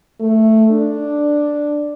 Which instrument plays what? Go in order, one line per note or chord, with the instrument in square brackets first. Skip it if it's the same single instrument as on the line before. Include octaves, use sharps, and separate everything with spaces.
[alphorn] A3
D4